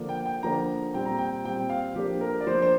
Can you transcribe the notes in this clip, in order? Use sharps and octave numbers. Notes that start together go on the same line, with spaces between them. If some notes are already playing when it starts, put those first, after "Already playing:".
Already playing: D3 F3 A#3 D4
G5
G5
D3 F3 A#3 D4 A#5
A#2 G3 C4 G5
A#5
G5
A#2 G3 C4 G5
F5
F3 A#3 D4 G4
A#4
D5
F3 A#3 D4 C5
C5